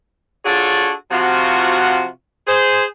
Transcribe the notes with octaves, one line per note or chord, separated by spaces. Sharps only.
D4 F4 F#4 G#4 A4 C#5
C3 F3 F4 F#4
G#4 C5